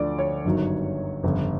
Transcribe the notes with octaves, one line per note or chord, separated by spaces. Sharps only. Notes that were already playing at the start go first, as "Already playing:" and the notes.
Already playing: D2 D3 F3 D5
C#5
G1 F#2 D#3 F#3
G1 F2 C#3